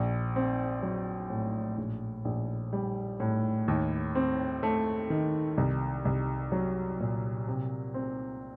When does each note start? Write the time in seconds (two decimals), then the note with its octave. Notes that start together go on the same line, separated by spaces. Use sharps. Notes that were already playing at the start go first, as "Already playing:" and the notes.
Already playing: A#1
0.36 C4
0.83 F#3
1.30 A2
1.77 A#1
2.25 A#1
2.73 G3
3.20 A2
3.68 D#2
4.15 C4
4.63 A3
5.10 D#3
5.57 C2
6.05 C2
6.52 F#3
7.00 A#2
7.48 C3
7.94 C4